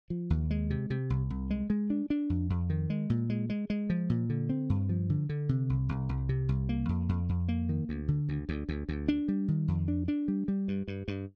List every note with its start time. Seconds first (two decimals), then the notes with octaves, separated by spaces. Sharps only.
0.10 F3
0.30 D#2
0.51 G#3
0.70 C3
0.90 C3
1.10 C2
1.30 C2
1.50 G#3
1.70 G#3
1.90 D4
2.10 D4
2.30 F2
2.50 F2
2.70 D#3
2.90 G#3
3.10 A#2
3.30 G#3
3.50 G#3
3.70 G#3
3.90 F3
4.10 A#2
4.30 D3
4.49 C4
4.70 G2
4.89 F3
5.10 D3
5.29 D3
5.49 C3
5.70 C2
5.89 C2
6.09 C2
6.29 C3
6.49 C2
6.69 A#3
6.89 F2
7.09 F2
7.29 F2
7.48 A#3
7.69 D#3
7.89 D2
8.08 D3
8.29 D2
8.49 D2
8.69 D2
8.89 D2
9.08 D4
9.28 G3
9.48 D#3
9.68 F2
9.88 D4
10.08 D4
10.28 G3
10.48 G3
10.68 G2
10.88 G2
11.08 G2